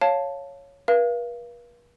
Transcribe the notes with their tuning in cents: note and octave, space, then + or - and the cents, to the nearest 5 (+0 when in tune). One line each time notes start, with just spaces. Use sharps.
C#5 +0 F5 +0 A5 +0
B4 -45 F5 -30